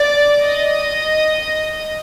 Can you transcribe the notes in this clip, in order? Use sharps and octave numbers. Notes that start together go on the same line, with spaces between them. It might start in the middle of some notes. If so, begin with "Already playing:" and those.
Already playing: D5
D#5